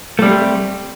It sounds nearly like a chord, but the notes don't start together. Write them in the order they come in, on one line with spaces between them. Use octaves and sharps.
A3 G3 C4